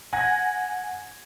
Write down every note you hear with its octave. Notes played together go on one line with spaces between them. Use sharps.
F#5 G#5 G#6 A#6